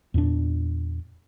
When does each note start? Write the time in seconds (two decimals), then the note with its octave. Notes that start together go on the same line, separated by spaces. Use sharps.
0.14 E2 A#2 C#4 D4